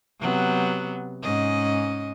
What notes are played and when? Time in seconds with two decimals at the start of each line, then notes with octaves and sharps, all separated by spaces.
0.20 C3 F#3 B3
1.23 G#2 C#4 D#5